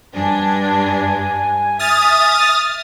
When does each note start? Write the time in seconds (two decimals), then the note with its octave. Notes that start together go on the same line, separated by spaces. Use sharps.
0.15 G2 D4 G#5
1.79 E5 D#6 F6 A6